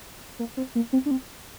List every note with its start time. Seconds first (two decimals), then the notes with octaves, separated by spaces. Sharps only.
0.39 A#3
0.57 C4
0.75 A#3
0.93 C4
1.06 D4
1.11 C4